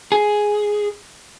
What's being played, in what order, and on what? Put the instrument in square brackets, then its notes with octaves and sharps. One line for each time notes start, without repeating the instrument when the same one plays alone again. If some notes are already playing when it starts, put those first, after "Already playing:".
[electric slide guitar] G#4